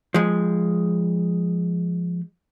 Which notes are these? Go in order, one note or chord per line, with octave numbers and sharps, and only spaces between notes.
F3 G#3